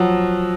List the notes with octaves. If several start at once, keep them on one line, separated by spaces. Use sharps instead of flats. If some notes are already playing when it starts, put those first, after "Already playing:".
Already playing: F3 F#3